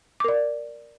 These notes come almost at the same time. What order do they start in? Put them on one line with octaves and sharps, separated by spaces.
D6 A#4 D5